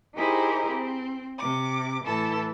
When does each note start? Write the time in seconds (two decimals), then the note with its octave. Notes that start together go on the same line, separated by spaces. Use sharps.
0.16 D#4 E4 G4 G#4 A#4 C5
0.71 C4
1.39 C3 D6
2.05 A2 E3 E4 A4 A5